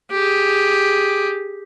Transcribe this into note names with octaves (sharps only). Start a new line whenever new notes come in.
G4 G#4